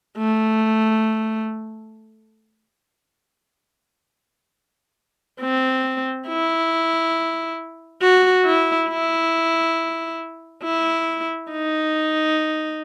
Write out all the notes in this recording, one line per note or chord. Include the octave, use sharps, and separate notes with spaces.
A3
C4
E4
F#4
E4
E4
E4
D#4